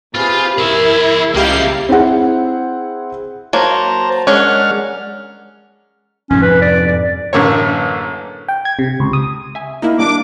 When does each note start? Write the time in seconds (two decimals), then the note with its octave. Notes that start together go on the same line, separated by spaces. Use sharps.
0.15 C3 F4 G4 G#4 B4
0.58 E4 G#4 A#4 E5
1.34 C#2 G3 A#3 G4 E5 F5 C7
1.89 C4 E4 G#4 F#5
3.53 F#3 A#3 C5 A5 A#5
4.27 G#3 C#4 D4 A#4 F#5 F6
6.30 F2 G#2 C3 C#4
6.43 B4
6.62 D5
6.88 D5
7.33 A1 F#2 D3 A#3 C#5
8.48 G5
8.65 G#6
8.79 C3
9.00 C#2
9.13 D#6
9.55 E5 G#5
9.82 A#3 D#4 E4
9.99 G3 A#3 D4 D6